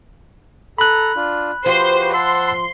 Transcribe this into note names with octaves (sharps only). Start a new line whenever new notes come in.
A4 A#5 B5 F#6
D4 F4
F3 F#4 G4 B4 C5
F#5 A5 C6 E6